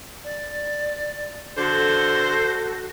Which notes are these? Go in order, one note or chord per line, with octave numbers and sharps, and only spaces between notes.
D5
D3 F#4 A4 C5